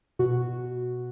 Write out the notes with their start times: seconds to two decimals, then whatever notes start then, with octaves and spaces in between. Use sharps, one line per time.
0.19 B2 F#4